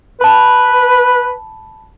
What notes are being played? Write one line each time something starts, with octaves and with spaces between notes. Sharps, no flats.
B4 A5 B5